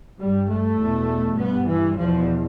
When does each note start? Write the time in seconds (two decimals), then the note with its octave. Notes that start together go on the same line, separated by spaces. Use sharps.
0.20 G2 G3
0.50 A3
0.80 E2 B2
1.39 G2 B3
1.67 E3
1.97 E2 B2 F3